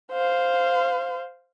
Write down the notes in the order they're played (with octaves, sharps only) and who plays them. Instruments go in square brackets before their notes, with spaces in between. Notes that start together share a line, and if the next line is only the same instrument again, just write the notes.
[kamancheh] C5 F5